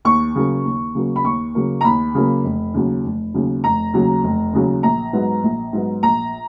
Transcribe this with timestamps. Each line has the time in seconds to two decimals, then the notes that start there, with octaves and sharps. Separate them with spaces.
0.05 D#2 C#6
0.35 C#3 F#3 A#3
0.65 D#2
0.95 C#3 F#3 A#3
1.16 B5
1.24 D#2 C#6
1.55 C#3 F#3 A#3
1.81 A#5
1.84 D#2 B5
2.15 C#3 F#3 A#3
2.44 F1
2.74 D#2 C#3 F#3
3.04 F1
3.34 D#2 C#3 F#3
3.64 F1 A#5
3.93 D#2 C#3 F#3
4.24 F1
4.53 D#2 C#3 F#3
4.83 A#1 A#5
5.13 G#2 F#3 B3
5.43 A#1
5.73 G#2 F#3 B3
6.03 A#1 A#5